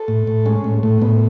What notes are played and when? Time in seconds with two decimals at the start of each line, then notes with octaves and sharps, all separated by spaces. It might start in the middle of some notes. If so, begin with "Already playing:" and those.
Already playing: A4
0.08 A2
0.27 A2
0.46 G#3 C#4
0.64 A2
0.83 A2 A3
1.02 A2 B3